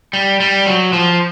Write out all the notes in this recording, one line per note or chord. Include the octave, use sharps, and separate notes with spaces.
G3
G3
F#3
F3